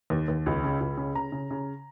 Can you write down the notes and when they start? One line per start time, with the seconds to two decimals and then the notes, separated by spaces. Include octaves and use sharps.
0.10 D#2
0.28 D#2
0.46 C#2
0.64 C#3
0.81 C#2
0.97 C#3
1.15 C#3 A#5
1.32 C#3
1.51 C#3